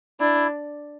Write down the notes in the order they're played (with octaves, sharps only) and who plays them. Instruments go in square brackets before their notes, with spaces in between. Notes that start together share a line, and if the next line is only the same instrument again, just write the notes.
[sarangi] D4 [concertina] E4